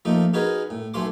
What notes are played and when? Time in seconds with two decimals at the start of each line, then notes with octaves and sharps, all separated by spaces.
0.05 F3 A3 A#3 D#4
0.34 C#4 D#4 F#4 G#4 A#4 B4
0.70 A2
0.94 B1 A3 C#4 C6 D6